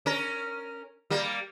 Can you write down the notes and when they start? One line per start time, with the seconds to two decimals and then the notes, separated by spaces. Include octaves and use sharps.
0.06 C#4 A#4
1.10 G3 A#3